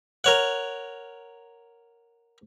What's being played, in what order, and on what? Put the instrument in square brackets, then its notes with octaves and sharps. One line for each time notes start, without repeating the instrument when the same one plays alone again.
[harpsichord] A#4 C#5 F#5